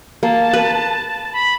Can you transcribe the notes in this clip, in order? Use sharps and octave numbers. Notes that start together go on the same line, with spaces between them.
A#3 A5
B4
B5